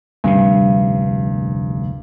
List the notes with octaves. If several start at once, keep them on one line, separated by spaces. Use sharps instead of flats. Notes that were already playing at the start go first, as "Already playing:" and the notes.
F1 D2 G2 C3